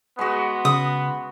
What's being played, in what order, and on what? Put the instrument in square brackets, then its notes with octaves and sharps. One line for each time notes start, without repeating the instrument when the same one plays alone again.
[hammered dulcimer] G#3 F#4 [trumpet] B3
[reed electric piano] C#3 [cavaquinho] D#6